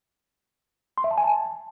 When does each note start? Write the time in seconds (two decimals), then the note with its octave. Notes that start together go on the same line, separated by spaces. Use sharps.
0.98 C6
1.04 E5
1.11 A5
1.18 G#5
1.24 A5